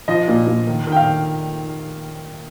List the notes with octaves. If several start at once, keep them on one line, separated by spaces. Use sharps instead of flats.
F3 D#5
A#2
A#2
D#3
D#3 G5
F5
D#3